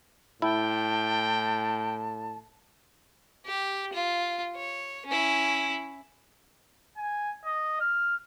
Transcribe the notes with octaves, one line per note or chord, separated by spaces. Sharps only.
A2 E4 G5 A5
G4
F4
C#5
C#4 E4
G#5
D#5
F6